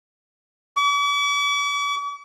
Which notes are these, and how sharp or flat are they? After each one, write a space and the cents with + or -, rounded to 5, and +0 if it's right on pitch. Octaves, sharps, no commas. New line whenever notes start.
D6 -45